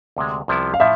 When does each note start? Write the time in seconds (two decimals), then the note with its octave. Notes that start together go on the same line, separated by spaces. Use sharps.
0.17 D2 C3 G#3
0.48 C2 C3 F3 B3 E4
0.74 F5
0.80 A2 F3 E5